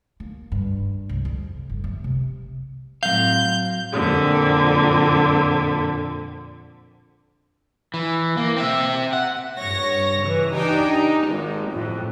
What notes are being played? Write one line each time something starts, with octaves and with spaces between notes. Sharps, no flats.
A#3
G2
C2
F2
G1
A3
C3
A2 F#3 C4 F5 G6
F2 A#2 D3
E3
A#3
C4 E5
F#5
G2 C#5 A#6
C#3 E3
D4 D#4 G4 G5 G#5
D#4
G#1
F2 A2